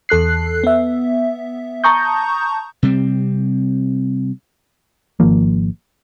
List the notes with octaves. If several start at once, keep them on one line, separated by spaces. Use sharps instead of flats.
E2 A4 F#6 C7
B3 E5
A5 A#5 C#6 D#6 G6
C3 G3 C4
G#1 D#3 F3 A#3